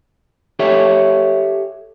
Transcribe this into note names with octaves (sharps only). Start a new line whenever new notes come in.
G4 A4 C#5 E5 G5